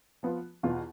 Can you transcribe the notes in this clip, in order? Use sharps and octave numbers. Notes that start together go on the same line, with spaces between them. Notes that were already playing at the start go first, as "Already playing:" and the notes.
F3 B3 F4
E2 B2 B3 F4 B4